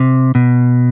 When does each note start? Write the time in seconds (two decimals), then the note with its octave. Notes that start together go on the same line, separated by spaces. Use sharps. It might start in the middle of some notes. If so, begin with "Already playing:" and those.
Already playing: C3
0.35 B2